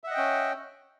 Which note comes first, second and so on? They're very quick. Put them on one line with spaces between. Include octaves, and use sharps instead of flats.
E5 F#5 D#5 G5 C#4